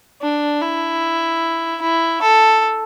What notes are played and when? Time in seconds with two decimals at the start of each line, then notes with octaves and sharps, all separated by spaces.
0.21 D4
0.62 E4
1.81 E4
2.22 A4